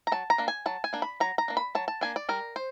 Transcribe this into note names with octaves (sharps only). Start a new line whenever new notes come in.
A#5
F#3 A5
A#5
A#3 D4
G#5
F#3 A5
G#5
A#3 D4
B5
F#3 A#5
A#5
A#3 D4
B5
F#3 A5
A5
A#3 D4 G#5
D5
G3 A#4
C5